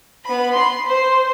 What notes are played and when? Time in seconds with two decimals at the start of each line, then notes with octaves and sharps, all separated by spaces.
0.25 B3 B5
0.55 B5 C6
0.87 C5